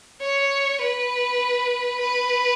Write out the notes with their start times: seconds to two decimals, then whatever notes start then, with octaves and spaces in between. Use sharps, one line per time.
0.21 C#5
0.81 B4
2.00 B4